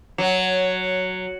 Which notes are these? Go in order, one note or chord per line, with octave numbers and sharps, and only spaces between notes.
F#3